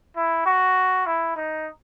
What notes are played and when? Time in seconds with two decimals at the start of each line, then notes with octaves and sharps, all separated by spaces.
0.17 E4
0.46 F#4
1.07 E4
1.36 D#4